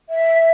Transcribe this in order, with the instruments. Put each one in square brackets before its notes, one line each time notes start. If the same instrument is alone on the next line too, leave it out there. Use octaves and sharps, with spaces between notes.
[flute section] E5